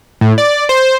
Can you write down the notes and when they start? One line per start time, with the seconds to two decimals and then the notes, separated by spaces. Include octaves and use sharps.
0.21 A2
0.38 D5
0.69 C5